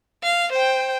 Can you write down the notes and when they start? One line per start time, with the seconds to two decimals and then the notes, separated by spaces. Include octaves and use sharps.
0.23 F5
0.53 C5 G5